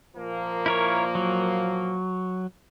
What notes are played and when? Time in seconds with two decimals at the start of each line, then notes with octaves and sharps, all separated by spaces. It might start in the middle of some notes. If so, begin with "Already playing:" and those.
0.16 A#2 F3 A#3
0.66 E4 A#4 C#5
1.15 F#3